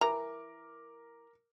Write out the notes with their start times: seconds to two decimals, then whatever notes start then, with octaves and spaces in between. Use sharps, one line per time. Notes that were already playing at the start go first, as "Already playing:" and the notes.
0.01 E3 A#4 A#5 D6